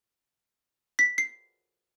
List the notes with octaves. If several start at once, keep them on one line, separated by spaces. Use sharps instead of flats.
B6
C7